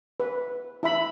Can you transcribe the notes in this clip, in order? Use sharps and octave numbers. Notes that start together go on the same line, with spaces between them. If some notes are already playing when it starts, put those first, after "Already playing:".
B4
E4 E5 B5